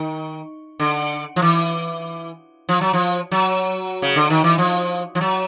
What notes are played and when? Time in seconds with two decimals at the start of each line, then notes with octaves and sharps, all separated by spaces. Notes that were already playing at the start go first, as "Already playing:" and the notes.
Already playing: D#3
0.80 D3
1.36 F3
1.42 E3
2.69 F3
2.81 F#3
2.93 F3
3.32 F#3
4.02 C#3
4.16 D3
4.30 D#3
4.44 E3
4.58 F3
5.15 F3
5.21 F#3